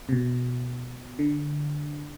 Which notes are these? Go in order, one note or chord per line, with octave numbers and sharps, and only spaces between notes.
C3
B2
D3